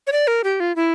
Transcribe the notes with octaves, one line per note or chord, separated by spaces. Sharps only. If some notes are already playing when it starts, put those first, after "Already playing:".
C#5
D5
A#4
G4
F4
E4